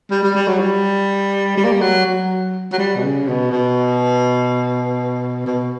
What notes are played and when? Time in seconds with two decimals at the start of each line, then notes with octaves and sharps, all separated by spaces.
0.11 G3
0.23 G3
0.35 G3
0.48 F#3
0.59 G3
1.57 G3
1.64 A#3
1.73 G3
1.81 F#3
2.05 F#3
2.72 F#3
2.79 G3
2.96 B2
3.03 C#3
3.28 B2
3.51 B2
5.46 B2